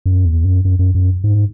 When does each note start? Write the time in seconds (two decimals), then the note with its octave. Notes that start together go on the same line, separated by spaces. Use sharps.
0.06 F#2
0.25 E2
0.45 F#2
0.65 F#2
0.79 F#2
0.95 F#2
1.24 G#2